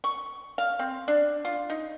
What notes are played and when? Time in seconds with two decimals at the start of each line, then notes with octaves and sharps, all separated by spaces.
0.04 C#6
0.58 F5
0.79 C4
1.08 D4
1.45 F4
1.70 D#4